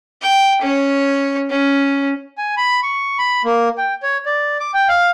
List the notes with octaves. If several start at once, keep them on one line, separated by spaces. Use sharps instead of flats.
G5
C#4 C#5
C#4
G#5
B5
C#6
B5
A#3
G5
C#5
D5
D6
G5
F5